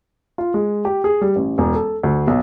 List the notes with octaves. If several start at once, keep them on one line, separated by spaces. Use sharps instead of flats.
F4
G#3
G4
G#4
G3
A1
E1
A4
D2
B1